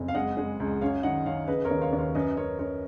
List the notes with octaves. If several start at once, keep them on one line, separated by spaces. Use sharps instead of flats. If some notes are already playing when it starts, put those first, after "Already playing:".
Already playing: F#1 F2
F5
G#3 D#5 F#5
G#3
C#2
F#2 C#5 F5
D#3 D#5 F#5
F#2 C#5 F5
C#3 B4 D#5
A#4 C#5
D#2
C#5 F5
D#2
C#5 F5
F#2 B4 D#5
F#2 A#4 C#5
F#2 A#4 C#5